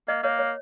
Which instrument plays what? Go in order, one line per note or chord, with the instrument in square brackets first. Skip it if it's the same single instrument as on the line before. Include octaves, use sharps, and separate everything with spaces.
[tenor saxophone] A#3 [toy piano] D#5
[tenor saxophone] A#3 [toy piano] C#5
[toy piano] C#5